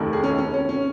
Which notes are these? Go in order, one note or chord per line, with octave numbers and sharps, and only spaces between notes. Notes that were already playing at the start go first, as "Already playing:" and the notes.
Already playing: F1 D#2 D#3
G#4
C#4
C#4
C#4
C#4